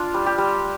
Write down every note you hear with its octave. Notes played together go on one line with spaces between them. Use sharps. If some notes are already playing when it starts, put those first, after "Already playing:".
Already playing: D4 F4
G3
G4
G3